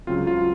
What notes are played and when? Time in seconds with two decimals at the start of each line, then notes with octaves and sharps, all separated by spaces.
0.07 C#2 C#3 F#3 C4 F4
0.27 F4